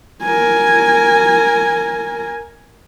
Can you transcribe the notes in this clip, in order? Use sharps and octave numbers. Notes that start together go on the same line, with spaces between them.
A#4 G#5